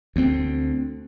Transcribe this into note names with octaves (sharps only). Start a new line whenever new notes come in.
D2 C4